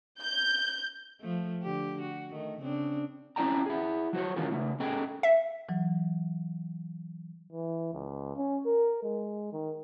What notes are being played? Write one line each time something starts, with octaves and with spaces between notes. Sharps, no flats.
G6
F3 A3
D3 G4
F#4
D#3 A3
C#3 C4 D4
C4 C#4 E4 D5 G5 A#5
E4 G#4
F#3 F#4 C5 C#5
D#3 E3 C#4 F4 G#4 A#4
C#3 A3
A#3 C#4 G#4 A4 D#5 G5
E5
E3 F#3
E3
C#2
C#4
A#4
G#3
D#3